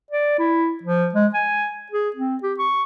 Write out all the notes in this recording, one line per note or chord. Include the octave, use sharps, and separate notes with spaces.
D5
E4
F3
G#3
G#5
G#4
C4
G4
C#6